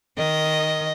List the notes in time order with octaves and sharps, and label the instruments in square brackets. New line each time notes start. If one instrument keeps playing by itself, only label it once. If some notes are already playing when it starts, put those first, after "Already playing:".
[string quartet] D#3 [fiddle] D#5